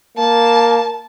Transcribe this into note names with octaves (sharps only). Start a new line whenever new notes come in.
A#3 A5